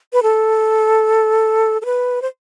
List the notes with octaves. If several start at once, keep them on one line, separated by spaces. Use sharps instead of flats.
B4
A4
A4
B4
C5